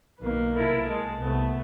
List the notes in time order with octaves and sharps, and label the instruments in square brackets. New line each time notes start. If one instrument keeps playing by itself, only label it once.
[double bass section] B1 D#3 [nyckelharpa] A#3 B4
[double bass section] C2 [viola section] E4 A4 A#4
[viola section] G#3 [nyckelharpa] A5
[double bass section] C2 [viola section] A3 B3